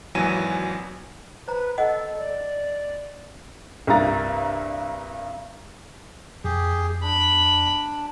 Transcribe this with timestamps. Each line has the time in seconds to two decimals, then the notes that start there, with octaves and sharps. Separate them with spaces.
0.15 G#1 D#2 E3 F#3 G#5 D#7
1.48 B4 C5 A#5
1.78 A4 D#5 F#5
2.17 D5
3.87 C2 G2 A#3 F4 A#5 A6
6.44 F2 G4 G#4
7.03 D4 B5